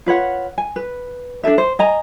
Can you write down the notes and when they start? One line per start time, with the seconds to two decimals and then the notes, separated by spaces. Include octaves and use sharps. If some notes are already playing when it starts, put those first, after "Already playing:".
0.06 F4 B4 C#5 F#5
0.58 G#5
0.76 B4
1.43 D4 G#4 A4 E5
1.58 C5
1.79 D#5 G#5 A#5